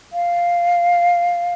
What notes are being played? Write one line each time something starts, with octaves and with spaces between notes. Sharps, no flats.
F5